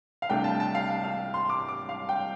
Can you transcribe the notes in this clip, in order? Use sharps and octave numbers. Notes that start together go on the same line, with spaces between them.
F5
C2 C3 A3 D4 G5
A5
A5
F5
F5
F5
C6
D6
D6
F5
G5